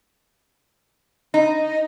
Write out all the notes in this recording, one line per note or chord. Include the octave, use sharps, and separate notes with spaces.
D#4